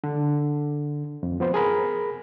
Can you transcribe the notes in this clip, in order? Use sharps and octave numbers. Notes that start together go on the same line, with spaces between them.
D3
F2
F3 B3 C5
G#4 A#4 B5